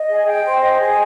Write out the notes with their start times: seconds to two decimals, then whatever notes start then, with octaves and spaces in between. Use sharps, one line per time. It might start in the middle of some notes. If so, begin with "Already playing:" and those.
Already playing: D#5
0.09 G#4
0.26 G5
0.44 C5
0.62 D#5
0.80 G#4